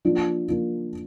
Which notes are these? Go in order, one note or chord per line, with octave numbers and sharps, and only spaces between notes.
F3 A#3 D4 F4
F3 A#3 D4 F4